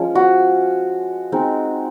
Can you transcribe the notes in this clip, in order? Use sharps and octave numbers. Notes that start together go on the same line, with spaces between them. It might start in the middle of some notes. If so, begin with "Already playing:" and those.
Already playing: F3 G#3 C#4
F#4
G#3 C4 D#4